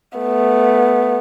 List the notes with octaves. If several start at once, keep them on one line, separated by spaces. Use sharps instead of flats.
A3 B3